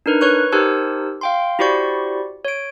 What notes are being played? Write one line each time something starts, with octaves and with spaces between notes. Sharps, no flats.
D4 D#4 A#4 B4
B4 C#5 C#6 F#6
D#4 G4 A#4 C5 A5 E6
F5 G5 C6
E4 F#4 G4 C5 D5 C#6
C#5 D7